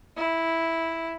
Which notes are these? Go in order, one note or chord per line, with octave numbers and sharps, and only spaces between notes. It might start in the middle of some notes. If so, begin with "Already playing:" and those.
E4